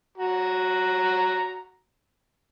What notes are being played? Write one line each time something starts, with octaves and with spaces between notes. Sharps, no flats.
F#4 A#5